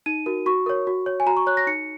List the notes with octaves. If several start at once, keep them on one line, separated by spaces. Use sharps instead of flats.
D#4 D#7
F#4 A#4
F#4 C#6
A#4 C#5
F#4
C#5
G#5
F#4 A#5
C#6
C#5 F#6
A#6
D#4 C#7